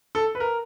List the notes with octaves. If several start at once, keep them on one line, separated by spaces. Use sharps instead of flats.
A4
B4
A#4